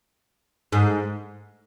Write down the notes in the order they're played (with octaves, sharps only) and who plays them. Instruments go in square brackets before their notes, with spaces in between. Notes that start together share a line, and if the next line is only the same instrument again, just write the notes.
[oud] G#2